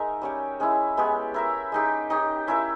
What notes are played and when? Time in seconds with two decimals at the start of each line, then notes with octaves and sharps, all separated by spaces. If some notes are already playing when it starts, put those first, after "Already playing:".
Already playing: G#3 D#4 A#4 E5
0.22 G3 C#4 G4 C#5
0.60 G#3 C#4 E4
0.97 G#3 B3 G4 C#5
1.34 E4 A#4 E5
1.72 G#3 D#4 G4
2.10 D#4 G4 C#5
2.47 C#4 E4 A#4 E5